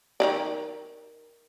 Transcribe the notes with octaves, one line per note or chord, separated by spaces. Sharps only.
D#3 A3 D5